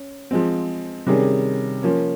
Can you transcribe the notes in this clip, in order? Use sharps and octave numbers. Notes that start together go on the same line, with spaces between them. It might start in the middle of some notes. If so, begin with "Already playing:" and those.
Already playing: C#4
F3 G#3 C4
C3 D#3 G3 C#4 G#4
F3 A#3 C#4